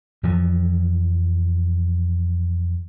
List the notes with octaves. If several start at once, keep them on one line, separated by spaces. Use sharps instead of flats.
F2 E3 F3